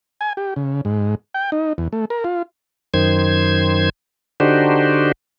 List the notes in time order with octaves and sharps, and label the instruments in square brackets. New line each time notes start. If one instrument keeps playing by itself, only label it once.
[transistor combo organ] G#5
G4
C#3
G#2
G5
D#4
E2
A3
A#4
F4
[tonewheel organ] F#2 D#3 C5 G#6
D3 D4 D#4 F#4 G4 C5